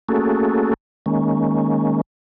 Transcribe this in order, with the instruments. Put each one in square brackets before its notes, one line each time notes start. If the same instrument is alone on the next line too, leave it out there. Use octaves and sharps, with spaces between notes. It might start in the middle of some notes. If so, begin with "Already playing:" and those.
[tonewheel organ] A3 A#3 C#4 F#4 G#4 A4
D#3 G#3 A#3 C#4